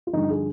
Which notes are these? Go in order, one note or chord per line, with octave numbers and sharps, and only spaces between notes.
F4
G2 D3 F3 D#4
G#4